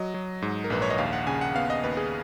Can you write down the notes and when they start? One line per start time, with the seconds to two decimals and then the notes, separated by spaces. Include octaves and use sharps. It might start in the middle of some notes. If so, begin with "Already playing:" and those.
Already playing: F#3 D#5
0.14 F#3
0.42 G#2
0.64 A#4
0.70 A#1 B4
0.82 C#5
0.90 D#5
0.98 D#2 F5
1.13 F#5
1.27 C#3 G#5
1.41 F#5
1.55 B3 F5
1.70 D#5
1.83 D#2 B4
1.97 G#4